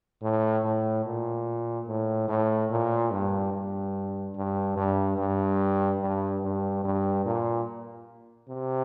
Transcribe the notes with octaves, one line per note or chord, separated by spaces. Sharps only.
A2
A2
A#2
A2
A2
A#2
G2
G2
G2
G2
G2
G2
G2
G2
A#2
C3